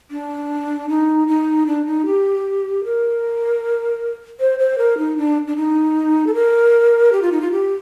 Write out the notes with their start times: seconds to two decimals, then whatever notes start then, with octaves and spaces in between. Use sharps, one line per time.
0.11 D4
0.89 D#4
1.28 D#4
1.67 D4
1.86 D#4
2.06 G4
2.84 A#4
4.40 C5
4.59 C5
4.78 A#4
4.98 D#4
5.18 D4
5.48 D4
5.57 D#4
6.27 A4
6.34 A#4
7.12 G4
7.22 F4
7.32 D#4
7.41 F4
7.52 G4